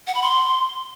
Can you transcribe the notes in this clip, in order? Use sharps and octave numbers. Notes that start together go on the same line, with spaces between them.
F#5
B5
C6